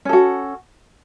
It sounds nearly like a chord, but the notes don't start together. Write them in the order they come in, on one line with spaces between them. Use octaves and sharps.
C#4 A4 F#4